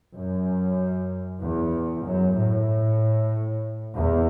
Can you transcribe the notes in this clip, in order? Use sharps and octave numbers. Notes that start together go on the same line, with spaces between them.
F#2
E2
F#2
A2
E2